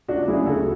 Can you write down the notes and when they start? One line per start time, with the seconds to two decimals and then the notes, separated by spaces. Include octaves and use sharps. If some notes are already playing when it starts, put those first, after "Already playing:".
0.08 C#2 D4 F#4
0.28 C#3 F#3 E4 G#4
0.46 D2 F#4 A4